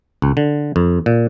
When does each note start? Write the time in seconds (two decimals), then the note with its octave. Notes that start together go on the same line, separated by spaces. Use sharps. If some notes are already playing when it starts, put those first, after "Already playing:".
0.22 C#2
0.37 D3
0.76 F2
1.06 A#2